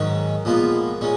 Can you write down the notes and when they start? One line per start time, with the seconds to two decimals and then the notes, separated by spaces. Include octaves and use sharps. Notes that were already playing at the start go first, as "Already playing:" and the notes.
Already playing: G#2 D#3 F#3 C#4
0.45 A#2 F3 G#3 B3 F4
1.01 A#2 G#3 C#4